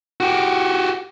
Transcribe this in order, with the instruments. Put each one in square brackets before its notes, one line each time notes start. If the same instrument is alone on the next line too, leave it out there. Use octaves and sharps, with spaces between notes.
[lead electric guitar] F#4 G4